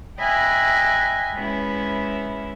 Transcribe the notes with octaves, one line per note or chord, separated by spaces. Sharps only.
D#5 E5 G5 G#5 B5 F#6
G#3 B3 C#4 E4 E5